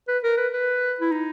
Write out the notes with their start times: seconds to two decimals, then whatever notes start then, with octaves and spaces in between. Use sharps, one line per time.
0.08 B4
0.23 A#4
0.37 B4
0.53 B4
1.00 E4
1.12 D#4